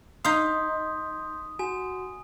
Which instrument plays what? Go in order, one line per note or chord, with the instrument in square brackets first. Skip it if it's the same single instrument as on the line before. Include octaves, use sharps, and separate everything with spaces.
[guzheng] D#4 F5 [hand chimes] C6 G6 B6 [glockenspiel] D#6
[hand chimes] F#4 [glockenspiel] G#5